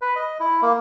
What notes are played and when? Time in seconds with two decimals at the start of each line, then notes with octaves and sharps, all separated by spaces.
0.02 B4
0.16 D#5
0.40 E4
0.62 A#3